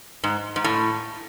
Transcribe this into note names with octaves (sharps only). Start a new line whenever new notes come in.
G#2
G#2
A2